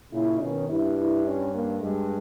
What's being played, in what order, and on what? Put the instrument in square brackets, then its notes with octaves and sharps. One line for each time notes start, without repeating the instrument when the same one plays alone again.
[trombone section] A#2 C#3 [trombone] E4
[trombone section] B2 D#3 [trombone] C#4
[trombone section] G2 [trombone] E4
[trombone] E4
C#4
A#3
[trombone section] G2 [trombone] G#3